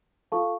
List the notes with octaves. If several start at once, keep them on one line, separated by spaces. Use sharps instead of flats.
F4 A4 F5 A5 C#6